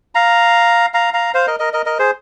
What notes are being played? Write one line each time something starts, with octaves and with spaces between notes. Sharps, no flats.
F5 A#5
F5 A#5
F5 A#5
C5 F5
A#4 D#5
A#4 D#5
A#4 D#5
A#4 D#5
G#4 C5